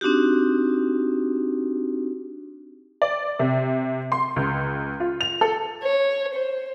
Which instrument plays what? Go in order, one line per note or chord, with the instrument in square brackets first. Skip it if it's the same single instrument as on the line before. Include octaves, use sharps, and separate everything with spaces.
[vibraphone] C4 D4 D#4 F#4 G4
[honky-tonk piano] D5
C3
C6
C#2
F4
F7
A4
[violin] C#5
C5